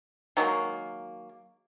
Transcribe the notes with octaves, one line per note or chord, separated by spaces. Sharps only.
D#3 F#3 G#3 A#3